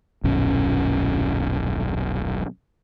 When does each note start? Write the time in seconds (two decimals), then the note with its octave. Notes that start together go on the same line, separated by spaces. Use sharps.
0.24 D#1 B1 F#2 C#4